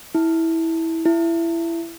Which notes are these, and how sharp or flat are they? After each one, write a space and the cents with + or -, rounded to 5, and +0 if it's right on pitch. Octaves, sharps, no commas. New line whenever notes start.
E4 -15
E4 +20